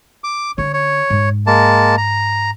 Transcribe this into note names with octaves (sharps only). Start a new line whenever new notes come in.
D6
D3 C#4 C#5
C#5
G#2
G#3 A#3 A5
A#5